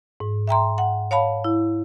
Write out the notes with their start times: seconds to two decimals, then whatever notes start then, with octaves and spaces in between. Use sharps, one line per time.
0.20 G#2
0.47 E5 G5 A#5 C6
0.78 F#5
1.11 C#5 F5 A5 B5
1.44 E4